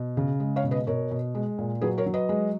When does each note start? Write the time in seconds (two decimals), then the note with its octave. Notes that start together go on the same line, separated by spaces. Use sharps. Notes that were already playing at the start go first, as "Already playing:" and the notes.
Already playing: B2
0.17 C#3
0.40 G#3
0.56 C#5 F5
0.64 B2
0.71 B4 D#5
0.87 B2 A#4 C#5
1.11 B2
1.35 G#3
1.59 A#2
1.81 F#3 G#4 B4
1.98 A#4 C#5
2.06 F#3
2.14 B4 D#5
2.29 G#3